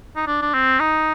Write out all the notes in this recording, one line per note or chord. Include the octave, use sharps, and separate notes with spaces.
D#4
D4
D4
C4
D#4